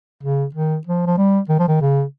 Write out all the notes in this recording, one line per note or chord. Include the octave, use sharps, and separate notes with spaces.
C#3
D#3
F3
F3
G3
D#3
F3
D#3
C#3